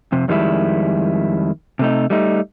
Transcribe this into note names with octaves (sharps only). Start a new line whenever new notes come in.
F2 C3
F2 D#3 G3 G#3 E4
C3 A3 D#4
G3 A3 D#4